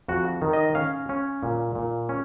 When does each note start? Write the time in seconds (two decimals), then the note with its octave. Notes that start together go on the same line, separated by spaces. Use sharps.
0.08 F2 F#4
0.42 D#3
0.53 D#5
0.75 C#4 F5
1.09 C#4
1.43 A#2
1.75 A#2
2.09 C#4